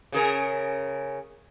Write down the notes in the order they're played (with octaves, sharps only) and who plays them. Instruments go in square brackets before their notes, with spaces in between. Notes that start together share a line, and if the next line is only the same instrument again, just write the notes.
[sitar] C#3 G#4 A#4